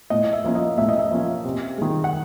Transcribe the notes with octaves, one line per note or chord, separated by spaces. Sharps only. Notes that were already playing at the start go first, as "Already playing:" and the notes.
A2 D#5
E5
F3 A#3 C#4
D#5
A2 E5
D#5
E5
F3 A#3 C#4
C3
D#3 G#3
F#5